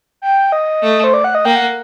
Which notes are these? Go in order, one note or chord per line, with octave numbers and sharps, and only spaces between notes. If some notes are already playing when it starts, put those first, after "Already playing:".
G5
D#5
A3
C5
D5
F#5
D#5
A#3 G5
F#5